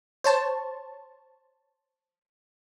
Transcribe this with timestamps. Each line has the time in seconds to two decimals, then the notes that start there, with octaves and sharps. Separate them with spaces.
0.24 C5 C#5 A5